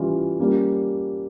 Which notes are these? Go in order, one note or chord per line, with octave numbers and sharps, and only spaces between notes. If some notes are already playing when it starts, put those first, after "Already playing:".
Already playing: E3 G3 C#4 F4
G3 A#3 C#4